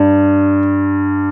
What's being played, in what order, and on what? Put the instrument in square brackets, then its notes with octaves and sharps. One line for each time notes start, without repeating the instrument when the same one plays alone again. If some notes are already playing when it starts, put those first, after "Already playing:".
Already playing: [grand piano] G2